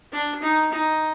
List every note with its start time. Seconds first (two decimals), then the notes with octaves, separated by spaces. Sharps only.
0.12 D4
0.42 D#4
0.72 D#4